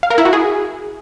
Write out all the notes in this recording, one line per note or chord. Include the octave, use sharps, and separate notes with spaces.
F5
A#4
E4
F#4
G#4